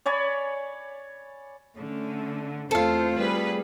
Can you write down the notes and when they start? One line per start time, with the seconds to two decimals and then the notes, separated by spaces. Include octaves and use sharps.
0.06 C#5 D5 G#5 B5
1.79 D3 A3 C#4
2.71 E2 A3 C4 F4 A4 C5 F5
3.18 G3 G#4 B4